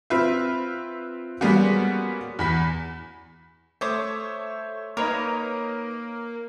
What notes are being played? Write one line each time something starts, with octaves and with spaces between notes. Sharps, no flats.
C4 F4 B4 E5
G3 G#3 A#3 B3 C#4 F#4
E2 B5 B6
A3 C5 C#5 E5 C6 D6 D#6
A#3 D#4 A#4 B4 C#5 A#5